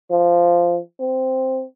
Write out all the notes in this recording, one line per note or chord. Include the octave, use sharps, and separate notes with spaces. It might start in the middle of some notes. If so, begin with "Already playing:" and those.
F3
C4